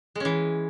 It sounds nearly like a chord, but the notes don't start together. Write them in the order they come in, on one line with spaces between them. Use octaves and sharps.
G#3 C#4 E3